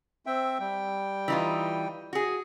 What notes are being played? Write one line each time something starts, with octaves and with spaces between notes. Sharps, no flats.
C4 E5 G5
G3 G5
E3 D#4 F4
F#4 G#4